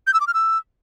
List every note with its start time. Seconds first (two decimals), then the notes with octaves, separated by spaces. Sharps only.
0.07 G6
0.14 E6
0.21 D6
0.27 F6
0.34 E6